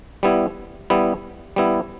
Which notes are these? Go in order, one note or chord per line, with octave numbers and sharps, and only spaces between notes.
G3 B3 E4
G3 B3 E4
G3 B3 E4